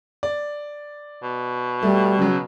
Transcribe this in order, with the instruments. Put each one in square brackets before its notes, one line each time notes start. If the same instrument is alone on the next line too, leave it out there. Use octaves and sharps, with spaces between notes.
[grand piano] D5
[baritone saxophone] B2
[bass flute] G3 [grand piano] A3
[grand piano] C#3 F#3